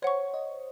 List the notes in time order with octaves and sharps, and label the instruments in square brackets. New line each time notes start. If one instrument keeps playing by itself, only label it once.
[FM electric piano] C5 [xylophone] C#5 F#5 C#6
[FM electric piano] D#5